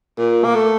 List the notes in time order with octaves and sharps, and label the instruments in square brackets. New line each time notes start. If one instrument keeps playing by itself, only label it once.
[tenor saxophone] A#2
A#3
A3